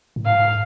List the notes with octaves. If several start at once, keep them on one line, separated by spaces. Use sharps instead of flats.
A2
G#2 F5